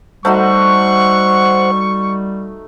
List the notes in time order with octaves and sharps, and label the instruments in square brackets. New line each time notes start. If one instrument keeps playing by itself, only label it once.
[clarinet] G3 [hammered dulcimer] A3 D#4 F#4 [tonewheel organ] C5 F#5 [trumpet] C#6